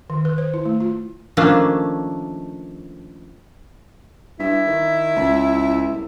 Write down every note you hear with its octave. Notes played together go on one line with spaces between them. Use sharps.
D#3
B4
C5
E4
A3
F4
D#3 F3 A3 A#3 C#4 D4
G2 E4
D#3
C#2
C2